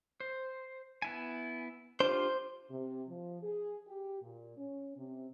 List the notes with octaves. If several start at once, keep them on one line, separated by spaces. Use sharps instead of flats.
C5
B3 E4 G#5
D4 F4 G4 C5
C3
F3
G#4
G4
A#2
C#4
C3